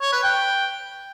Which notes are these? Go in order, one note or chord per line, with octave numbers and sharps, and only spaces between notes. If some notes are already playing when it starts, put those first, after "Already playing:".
C#5
B4
G5